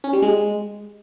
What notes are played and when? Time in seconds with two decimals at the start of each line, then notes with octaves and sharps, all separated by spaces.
0.04 C#4
0.13 G3
0.22 G#3